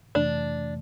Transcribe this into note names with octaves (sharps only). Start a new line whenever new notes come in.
F2 C3 E3 A3 D4